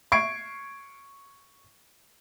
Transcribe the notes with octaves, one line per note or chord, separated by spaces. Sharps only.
C#6 G#6 C7 D7